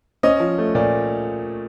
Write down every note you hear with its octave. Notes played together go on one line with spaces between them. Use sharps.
C#4 D#5
F3
A3
A#2 D5